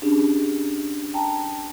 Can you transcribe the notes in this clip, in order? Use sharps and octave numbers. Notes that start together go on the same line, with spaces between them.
C#4 D4 G4 G#4
G5 A5 A#5